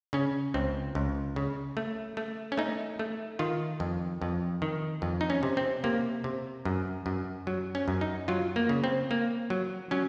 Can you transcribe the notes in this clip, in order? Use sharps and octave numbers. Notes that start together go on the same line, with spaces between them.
C#3 C#4
C#2 C4
C#2
C#3
A3
A3
C#4
A3 D#4
A3
D#3 F4
F2
F2
D#3
F2
D#4
C#4
C3
C4
C3 A#3
C3
F#2
F#2
F#3
C#4
F#2
D#4
F#3 F4
A#3
C#3
C4
A#3
F#3
F#3 C#4